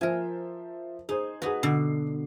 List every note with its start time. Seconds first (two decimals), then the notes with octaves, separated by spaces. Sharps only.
0.01 F3 A#4 C5 E5 G#5
1.09 D#4 G#4 C5
1.42 D#4 F#4 G#4 B4
1.63 B2 D3 C7